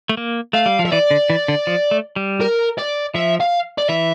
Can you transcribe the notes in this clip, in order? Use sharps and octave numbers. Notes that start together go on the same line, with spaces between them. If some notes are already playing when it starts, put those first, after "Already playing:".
A3
A#3
A3 F5
G3
F3
E5
E3 D5
D3
E3
D3
F3
A3
G3
A#4
D5
F3 E5
F5
D5
E3 E5